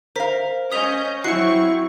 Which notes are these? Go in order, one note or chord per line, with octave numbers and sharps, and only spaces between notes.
A#4 C5 F5 B6
C#4 D#5 D#6 G6 B6 F7
F#3 C4 E4 F#4 C#6 C7 C#7